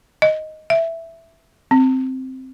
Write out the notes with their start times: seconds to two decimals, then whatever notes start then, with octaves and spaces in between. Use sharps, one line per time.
0.22 D#5
0.70 E5
1.71 C4